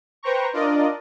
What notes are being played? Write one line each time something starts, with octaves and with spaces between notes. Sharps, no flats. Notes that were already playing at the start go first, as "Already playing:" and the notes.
B4 C5 G5 A#5 C#6
D4 F4 A#4 D5 D#5